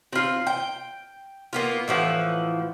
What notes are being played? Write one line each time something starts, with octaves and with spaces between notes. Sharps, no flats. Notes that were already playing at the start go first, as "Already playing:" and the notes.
C4 F4
G5
A#3 B3 F4
A2 E3 F3 F#5